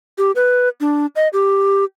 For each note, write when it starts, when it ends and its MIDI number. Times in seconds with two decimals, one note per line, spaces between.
0.18 0.32 67
0.36 0.69 71
0.81 1.06 62
1.16 1.28 75
1.33 1.85 67